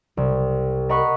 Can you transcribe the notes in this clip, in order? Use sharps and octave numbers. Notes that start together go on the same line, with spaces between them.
C2
A#4 D#5 F#5 B5 C#6